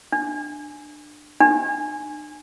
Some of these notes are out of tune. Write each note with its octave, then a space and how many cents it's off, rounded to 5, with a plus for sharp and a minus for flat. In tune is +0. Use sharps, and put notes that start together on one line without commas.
D4 +20
D4 +45